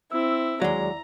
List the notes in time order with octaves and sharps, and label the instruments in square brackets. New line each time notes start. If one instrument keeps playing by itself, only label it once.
[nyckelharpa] C4 E4 [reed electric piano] E6
[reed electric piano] D#2 D5 [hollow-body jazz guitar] F#3 G#3 [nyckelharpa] A#5